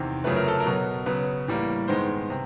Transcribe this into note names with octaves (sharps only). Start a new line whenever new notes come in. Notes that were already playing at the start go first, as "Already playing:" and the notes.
Already playing: E2 C3 D#3
F#2 C#3 F3 A3 B4
A#4
A4
A#4
B2 F#3 B3
C#3 F#3 B3 B4
A2 E3 G3 A#3
G2 D#3 G#3 B3 C5
C3